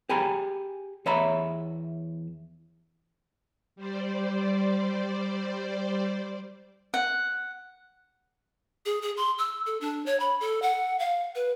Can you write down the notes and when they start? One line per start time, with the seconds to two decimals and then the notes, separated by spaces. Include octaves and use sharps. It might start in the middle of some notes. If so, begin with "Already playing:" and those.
0.09 G4 G#4 G#5 A#5 B5
1.06 E2 C#5 E5 A#5 B5
3.76 G3 C5 D5
6.94 F#5
8.86 G#4
9.02 G#4
9.17 C6
9.38 E6
9.66 A4
9.81 D4
10.06 C#5
10.20 B5
10.41 A4
10.62 F#5
10.99 F5
11.35 B4